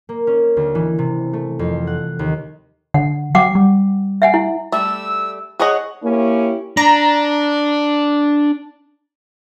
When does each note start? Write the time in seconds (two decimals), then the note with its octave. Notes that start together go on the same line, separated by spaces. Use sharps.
0.09 A#3
0.27 C#4
0.57 D2
0.75 E3
0.99 C3
1.33 A3
1.59 F2
1.87 F#5
2.19 D#2
2.94 D3 F#5
3.35 F#3 F#5 G5 D6
3.55 G3
4.22 E5 F#5 G#5
4.34 E4
4.72 G3 A3 E6
5.60 G#4 C#5 D#5 F#5
6.04 A#3 C#4 E4 G4
6.77 D4 A#5